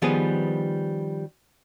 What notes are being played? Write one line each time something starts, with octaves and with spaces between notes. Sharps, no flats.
D#3 F3 G3 B3 G#4 B4